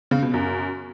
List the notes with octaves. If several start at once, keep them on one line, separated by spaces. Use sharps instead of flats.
C#3
B2
F#2